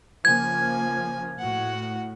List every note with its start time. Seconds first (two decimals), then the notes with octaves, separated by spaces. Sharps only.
0.25 C#3 F3 A#3 G#5 G#6
1.39 A2 F#4 F#5